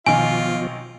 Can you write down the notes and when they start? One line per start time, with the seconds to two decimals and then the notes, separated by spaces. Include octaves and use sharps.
0.06 B1 B2 D#3 F3 F4 G#5